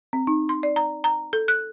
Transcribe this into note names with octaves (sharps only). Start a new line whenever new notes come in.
C4
D#4
C6
D5
A#5
A#5
A4
F#6